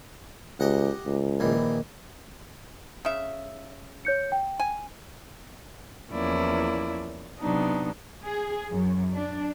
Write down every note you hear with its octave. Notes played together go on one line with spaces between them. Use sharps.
C#2 G4 D#5 F#5
C#2
A#1 D#3 E3
C#3 E5
C#5 G6 C#7
G5
G#5
E2 F3 A#3 C#4 E4 D5
C3 F#3 B3 D4 D#4
G#4
F#2
D4